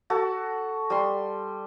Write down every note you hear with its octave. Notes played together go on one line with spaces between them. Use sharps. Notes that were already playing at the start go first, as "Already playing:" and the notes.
F#4 A4 A5
G3 C6